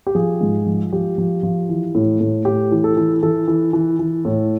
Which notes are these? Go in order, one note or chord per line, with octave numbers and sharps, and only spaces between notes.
G4
F3 G#4
G#2
F3
F3 G4
F3
F3
E3
A2
A2
A2 G4
E3
A4
E3
E3 A4
E3
E3
E3
A2